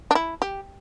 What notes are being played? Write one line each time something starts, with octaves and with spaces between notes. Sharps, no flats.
D4
E4
G4